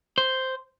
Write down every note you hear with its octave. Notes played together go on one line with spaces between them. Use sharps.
C5